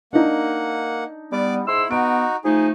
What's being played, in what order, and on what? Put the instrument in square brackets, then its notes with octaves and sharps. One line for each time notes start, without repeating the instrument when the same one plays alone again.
[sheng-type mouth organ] A#3 F#5 [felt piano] D4 D#4
[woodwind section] G3 B3 [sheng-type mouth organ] D5 D6
[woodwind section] G#2 C6 E6 [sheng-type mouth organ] E4
[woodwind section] B3 [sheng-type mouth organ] D#4 F#4 [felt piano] D7
[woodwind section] F3 A3 D#4 [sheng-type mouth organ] G#4